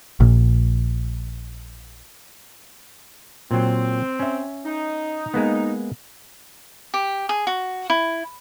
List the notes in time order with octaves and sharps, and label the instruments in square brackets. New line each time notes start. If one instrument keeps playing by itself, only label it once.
[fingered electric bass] A#1 A#2
[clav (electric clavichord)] A#2 F#3 [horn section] C4
[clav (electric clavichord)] C#4 E5
[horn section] D#4
[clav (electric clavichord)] G#3 A#3 B3
[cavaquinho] G4
G#4
F#4
E4